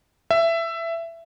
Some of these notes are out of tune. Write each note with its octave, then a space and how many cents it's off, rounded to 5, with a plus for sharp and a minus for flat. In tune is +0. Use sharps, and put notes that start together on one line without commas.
E5 +15